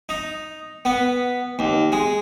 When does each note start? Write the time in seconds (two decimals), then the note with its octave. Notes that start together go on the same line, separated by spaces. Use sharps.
0.09 D#4
0.85 B3
1.59 D#2
1.92 G#3